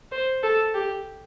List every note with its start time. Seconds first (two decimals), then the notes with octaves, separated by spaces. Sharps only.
0.12 C5
0.43 A4
0.74 G4